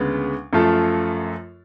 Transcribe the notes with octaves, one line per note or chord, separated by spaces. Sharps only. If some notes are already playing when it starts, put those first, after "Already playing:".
Already playing: D2 C#3 G#3 B3
F#2 F3 A3 F4 A4